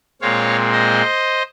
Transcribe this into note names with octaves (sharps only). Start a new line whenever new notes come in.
A#2 G#3 C4 C#5 F5
C5 D#5